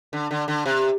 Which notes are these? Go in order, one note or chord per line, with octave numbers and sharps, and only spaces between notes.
D3
D3
D3
C3